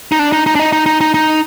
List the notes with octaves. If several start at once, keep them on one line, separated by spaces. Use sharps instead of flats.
D#4
D4
D#4
D#4
D4
D#4
D#4
D#4
D#4
D#4